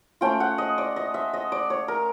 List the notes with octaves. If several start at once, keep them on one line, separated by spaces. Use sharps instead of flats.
A3 C#4 F4 G5
F#5
D#5
D5
D#5
E5
D#5
D5
C#5
A#4